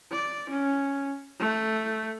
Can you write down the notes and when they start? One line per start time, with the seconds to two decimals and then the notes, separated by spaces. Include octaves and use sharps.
0.12 D5
0.50 C#4
1.40 A3